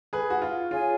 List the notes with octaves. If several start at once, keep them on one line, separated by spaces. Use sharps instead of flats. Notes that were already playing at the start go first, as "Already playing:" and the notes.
G#4 B4
F#4
F4
F4 G#4 C#5 G#5